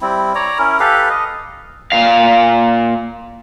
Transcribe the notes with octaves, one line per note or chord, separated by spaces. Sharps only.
G3 C4 E4
C#5 D5 A#5
C#4 E4 A#4
G4 A4 B4 F5
D#5
A#2 F5